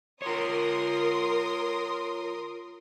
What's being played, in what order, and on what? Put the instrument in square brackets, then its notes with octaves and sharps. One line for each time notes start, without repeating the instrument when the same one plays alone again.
[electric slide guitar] F4 C#5 [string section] A#4 C6 D#6